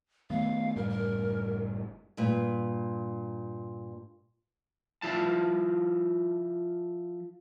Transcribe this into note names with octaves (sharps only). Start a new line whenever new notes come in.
D#3 A3 B3 F5
F#1 A2 G3 A#4
A#4
G2 A#2
F3 E4 A5